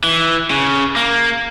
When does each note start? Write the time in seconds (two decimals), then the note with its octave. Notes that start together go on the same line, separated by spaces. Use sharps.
0.04 E3
0.50 C#3
0.96 A#3